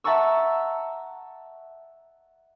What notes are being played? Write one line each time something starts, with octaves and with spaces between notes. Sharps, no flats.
E5 F#5 A5 A#5 C#6 E6